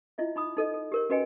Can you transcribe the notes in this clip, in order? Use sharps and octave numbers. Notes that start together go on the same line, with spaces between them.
E4 F4 D#5 E5
D#4 B5 D#6
D#4 A4 D#5
A4
G4 A#4 C#5
C#4 F#4 B4 D#5 G5 G#5